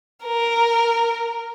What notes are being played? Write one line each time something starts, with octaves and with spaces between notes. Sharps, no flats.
A#4